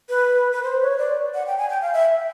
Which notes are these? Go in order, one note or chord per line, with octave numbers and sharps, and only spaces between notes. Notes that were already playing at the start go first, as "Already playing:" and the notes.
B4
B4
C5
C#5
D5
F#5
G5
G#5
G5
F5
E5